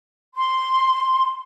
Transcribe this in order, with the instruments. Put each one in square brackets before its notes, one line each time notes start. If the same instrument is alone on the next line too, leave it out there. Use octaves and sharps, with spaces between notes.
[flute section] C6